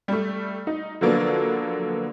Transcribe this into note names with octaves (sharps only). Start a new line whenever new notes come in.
G3 A3
D#4
D3 F3 F#3 A#3 B3 D4